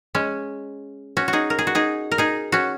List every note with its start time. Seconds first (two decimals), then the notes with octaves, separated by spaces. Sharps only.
0.15 G#3 C#4
1.17 C#4 F#4
1.28 F#4
1.33 D#4 G#4
1.50 A#4
1.59 G#4
1.67 F#4
1.75 D#4 G#4
2.11 A#4
2.18 D#4 G#4
2.52 C#4 F#4